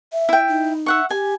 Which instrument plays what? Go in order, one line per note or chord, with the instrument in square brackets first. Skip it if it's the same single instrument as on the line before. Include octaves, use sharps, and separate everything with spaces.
[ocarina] E5
[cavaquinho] E4 G5
[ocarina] D#4
[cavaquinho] E5 F#5 C#6
[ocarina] G4 [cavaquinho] G#5